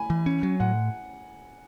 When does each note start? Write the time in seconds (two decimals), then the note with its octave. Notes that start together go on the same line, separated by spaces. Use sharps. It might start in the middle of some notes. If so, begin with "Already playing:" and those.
Already playing: G#5 B5
0.10 E3
0.26 C#4
0.43 F#3
0.60 A2 F#5